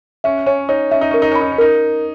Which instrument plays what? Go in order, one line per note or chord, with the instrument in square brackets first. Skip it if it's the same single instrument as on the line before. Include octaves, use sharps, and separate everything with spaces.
[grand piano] C#4 [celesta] E5
[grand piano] C#4 [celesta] C#5
[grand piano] D#4 [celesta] C#5
[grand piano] C#4 [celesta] E5
[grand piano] D#4
[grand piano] C#4 [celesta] A#4
[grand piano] D#4
[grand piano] C#4 [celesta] B5
[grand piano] D#4
C#4
[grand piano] D#4 [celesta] A#4